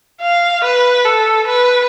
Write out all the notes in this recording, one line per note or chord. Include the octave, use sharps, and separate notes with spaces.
F5
B4
A4
B4